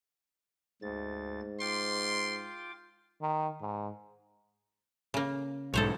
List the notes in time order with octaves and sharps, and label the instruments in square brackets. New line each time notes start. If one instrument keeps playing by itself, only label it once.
[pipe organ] D2 A6 [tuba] G#2
[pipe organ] F4 G5 D6 [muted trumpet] C6
[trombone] D#3
G#2
[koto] C#3 A#3
[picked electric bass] B1 G#2 [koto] A4 C5 C#5